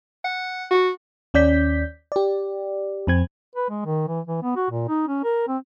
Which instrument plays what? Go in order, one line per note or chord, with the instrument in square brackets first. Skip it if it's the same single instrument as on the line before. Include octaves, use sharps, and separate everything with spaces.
[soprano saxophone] F#5
F#4
[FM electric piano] D#2 C#4 D5 G6 B6
G4 D5
F2 C4 G#6
[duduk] B4
G#3
D#3
E3
E3
B3
F#4
A#2
D#4
C#4
A#4
C4